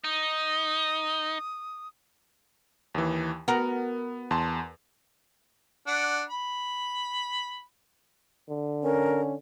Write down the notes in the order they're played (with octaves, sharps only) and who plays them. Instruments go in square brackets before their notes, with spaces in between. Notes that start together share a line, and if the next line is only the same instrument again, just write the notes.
[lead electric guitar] D#4 [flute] D#6
[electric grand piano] D#2 E3
[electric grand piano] B3 [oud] F#4 A#4
[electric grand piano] E2 A5 C6
[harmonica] D4 F#5
B5
[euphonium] D3
[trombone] C#4 [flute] A#4